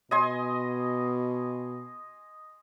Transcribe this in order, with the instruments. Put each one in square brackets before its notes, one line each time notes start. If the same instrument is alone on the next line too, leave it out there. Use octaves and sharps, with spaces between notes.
[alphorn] B2 [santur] D#5 G#5 C6